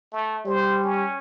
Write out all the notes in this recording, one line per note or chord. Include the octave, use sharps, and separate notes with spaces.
A3
G3 C5
C#4